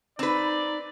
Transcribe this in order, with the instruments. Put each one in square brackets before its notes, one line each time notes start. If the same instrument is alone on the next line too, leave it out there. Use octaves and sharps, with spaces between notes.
[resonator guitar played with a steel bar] C4 B4 [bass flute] D#4 [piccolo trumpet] D5